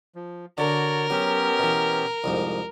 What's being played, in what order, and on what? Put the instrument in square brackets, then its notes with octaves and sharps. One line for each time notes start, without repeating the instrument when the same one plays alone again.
[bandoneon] F3
[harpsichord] D3 [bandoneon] F#4 C#5 D5 [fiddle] A#4
[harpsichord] F#3 [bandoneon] B3 C#4 G4
[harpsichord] B2 E3
C2 F2 G#2